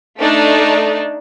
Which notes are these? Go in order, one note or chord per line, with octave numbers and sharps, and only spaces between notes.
A3 D4 D#4